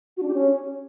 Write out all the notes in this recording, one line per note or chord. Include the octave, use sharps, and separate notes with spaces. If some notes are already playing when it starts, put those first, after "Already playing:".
F#4
D4
G4
C#4